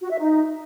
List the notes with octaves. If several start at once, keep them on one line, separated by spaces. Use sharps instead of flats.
F#4
E5
D#4